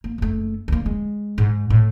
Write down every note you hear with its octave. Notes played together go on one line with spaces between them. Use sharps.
A#3
F#1 A3
D2 A#3
G#3
G#2
A2